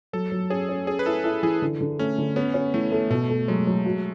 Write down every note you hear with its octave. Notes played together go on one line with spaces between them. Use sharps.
F#3 A4
F#3
C#4 G#4
C#4
C#4 G#4
B4
E4 A4
E4 A4
E3 G#4
D3
D3
A3 C#4
D3
B3 C#4
C#4
E3 A3
A3
B2 A3
A3
F#3 G#3
F#3
F#4